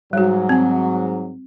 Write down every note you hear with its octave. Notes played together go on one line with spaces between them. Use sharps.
G#2 F#3 G3 F#4
C4 G#5